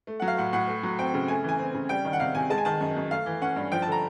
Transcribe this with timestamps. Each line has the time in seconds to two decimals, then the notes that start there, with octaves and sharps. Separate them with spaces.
0.07 A3
0.20 F#3 F#5
0.28 F5
0.38 A2 F#5
0.53 A2 F#5
0.67 A3
0.83 F#3
0.99 C4 G5
1.14 C#3
1.28 A3 G#5
1.44 E3 G#5
1.59 C4
1.74 C#3
1.89 G3 G5
2.05 D#3
2.13 F#5
2.20 C3 F5
2.35 C3 G#5
2.50 G#3 A5
2.58 G#5
2.65 D#3 A5
2.80 F#2
2.96 F#2
3.10 A3 F5
3.26 E3
3.42 C#4 F#5
3.56 G2
3.72 F3 G5
3.82 A5
3.86 D3
3.92 A#5